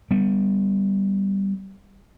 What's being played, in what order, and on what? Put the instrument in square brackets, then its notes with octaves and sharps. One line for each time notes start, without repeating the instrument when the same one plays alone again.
[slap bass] G3 B3